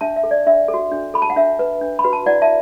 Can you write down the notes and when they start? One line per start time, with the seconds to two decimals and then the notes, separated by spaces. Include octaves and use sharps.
0.01 D4 E5 A5
0.16 E5
0.24 A4
0.31 D5
0.47 D4 E5
0.68 A4
0.74 F#4
0.91 D4
1.14 A4 B5
1.22 A5
1.30 F#5
1.36 D4 E5
1.59 B4
1.81 D4
1.99 B5
2.04 F#4 B4
2.13 A5
2.26 E4 D5 F#5
2.42 E5 A5